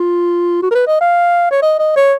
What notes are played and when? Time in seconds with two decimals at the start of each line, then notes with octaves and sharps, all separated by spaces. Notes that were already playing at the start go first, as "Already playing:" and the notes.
Already playing: F4
0.62 F#4
0.71 A#4
0.75 B4
0.87 D#5
1.01 F5
1.51 C#5
1.62 D#5
1.79 D#5
1.96 C#5